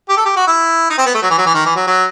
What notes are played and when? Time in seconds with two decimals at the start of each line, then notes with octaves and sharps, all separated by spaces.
0.09 G4
0.17 A4
0.25 G4
0.36 F#4
0.47 E4
0.90 D#4
0.98 C4
1.06 B3
1.14 A3
1.22 F#3
1.30 E3
1.38 F#3
1.46 E3
1.55 D#3
1.66 E3
1.76 F#3
1.87 F#3